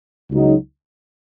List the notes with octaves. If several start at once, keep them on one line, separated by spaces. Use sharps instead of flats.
C#2 C#3 F#3 D#4